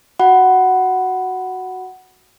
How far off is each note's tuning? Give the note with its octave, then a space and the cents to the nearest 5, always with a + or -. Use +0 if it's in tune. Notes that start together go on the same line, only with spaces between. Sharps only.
F#4 +0 F#5 +10 B5 +0